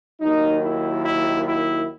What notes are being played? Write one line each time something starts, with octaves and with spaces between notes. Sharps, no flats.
D#2 D#3 F#3 D#4
E4
E4
E4